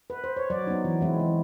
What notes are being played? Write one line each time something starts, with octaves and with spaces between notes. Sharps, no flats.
B4
C5
C#5
F#3 D5
B3 D#4
E3
G#3 C4 E4
E3